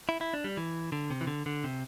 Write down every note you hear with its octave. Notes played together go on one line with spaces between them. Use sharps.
E4
E4
D4
G3
E3
D3
C3
E3
D3
D3
C3